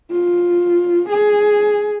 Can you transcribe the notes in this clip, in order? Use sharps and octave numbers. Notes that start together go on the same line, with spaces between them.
F4
G#4